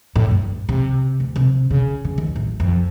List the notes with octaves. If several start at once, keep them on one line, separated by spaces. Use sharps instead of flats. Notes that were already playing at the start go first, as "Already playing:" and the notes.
A2
G2
C3
D2
C3
C#3
C#3
D#2
A1
F2